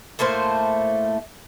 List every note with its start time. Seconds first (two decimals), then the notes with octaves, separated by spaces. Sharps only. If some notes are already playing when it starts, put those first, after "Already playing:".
0.19 A2 A3 A#3 C5